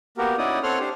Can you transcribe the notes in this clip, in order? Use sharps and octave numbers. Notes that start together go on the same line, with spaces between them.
A#3 B3 F#4 G4 A#4
C#4 D#4 E4 F#4 D5 D#6
C4 A4 C#5 F#5 C6 F6
D4 G4 C5